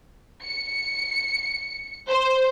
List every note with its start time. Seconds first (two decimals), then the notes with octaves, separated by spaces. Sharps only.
0.43 C#7
2.08 C5